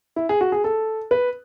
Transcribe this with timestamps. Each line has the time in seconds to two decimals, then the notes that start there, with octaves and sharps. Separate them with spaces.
0.16 E4
0.29 G#4
0.41 F#4
0.52 G#4
0.64 A4
1.11 B4